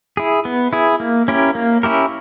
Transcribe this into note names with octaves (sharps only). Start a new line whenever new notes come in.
E4 G#4
B3
E4 G#4
A#3
C#4 E4 G4 A#4
A#3
C#4 E4 G4 A#4